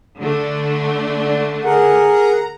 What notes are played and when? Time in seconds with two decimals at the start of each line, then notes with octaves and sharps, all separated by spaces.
0.20 D3 A3 D4
1.65 G#4 A#4 F#5
2.15 A#5